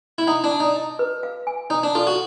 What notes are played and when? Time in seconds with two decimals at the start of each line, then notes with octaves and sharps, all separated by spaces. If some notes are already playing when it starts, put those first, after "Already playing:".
0.18 E4
0.27 D#4 F#5
0.44 D4
0.52 A5
0.60 D#4
0.76 D#5
0.99 B4
1.23 F5
1.47 G#5
1.70 D#4 C#5
1.83 D4
1.95 F4 A4
2.07 F#4